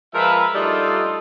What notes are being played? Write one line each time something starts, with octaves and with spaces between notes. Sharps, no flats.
F3 G#3 F4 A#4 B4 E5
G3 A3 D4 D#4 F4 A4